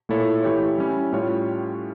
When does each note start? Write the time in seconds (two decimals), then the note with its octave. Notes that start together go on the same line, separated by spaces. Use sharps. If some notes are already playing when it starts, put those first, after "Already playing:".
0.09 A#2 A3 E4 A4 C#5
0.43 E3 A3 E4 G4 C#5
0.78 G3 C#4 E4
1.12 A2 G3 C#4 F4 C#5